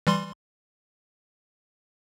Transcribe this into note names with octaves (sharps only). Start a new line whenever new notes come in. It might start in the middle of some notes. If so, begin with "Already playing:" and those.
E3 G3 C6